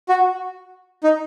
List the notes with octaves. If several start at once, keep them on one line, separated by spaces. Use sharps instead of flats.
F#4
D#4